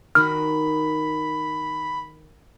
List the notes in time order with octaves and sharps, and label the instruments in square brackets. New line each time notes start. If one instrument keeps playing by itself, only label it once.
[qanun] D#3 D#4 F#4 [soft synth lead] B5 [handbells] F6